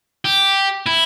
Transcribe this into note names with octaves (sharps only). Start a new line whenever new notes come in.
G4
E4